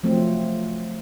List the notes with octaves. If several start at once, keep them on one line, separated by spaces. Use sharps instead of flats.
F3 F#3 A3 C4